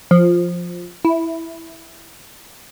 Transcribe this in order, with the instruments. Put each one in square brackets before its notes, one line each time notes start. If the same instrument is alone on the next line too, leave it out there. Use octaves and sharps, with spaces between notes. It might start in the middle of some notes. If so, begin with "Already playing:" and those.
[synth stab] F3
E4